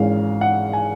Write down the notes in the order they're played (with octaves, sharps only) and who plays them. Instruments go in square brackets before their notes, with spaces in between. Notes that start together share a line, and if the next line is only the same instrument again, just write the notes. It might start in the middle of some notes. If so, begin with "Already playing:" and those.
Already playing: [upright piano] G#1 G#2 E3 G#3 C#4 F5
F#5
G#5